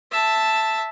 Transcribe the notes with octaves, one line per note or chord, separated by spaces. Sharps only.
E5 A5